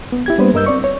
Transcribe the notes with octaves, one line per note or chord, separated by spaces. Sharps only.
B3
E4 G4 G#6
G3 A#3 B3 D4 B4 C5
G2 A#4 D#5 E6 G6
C4 D5 C#6
C#5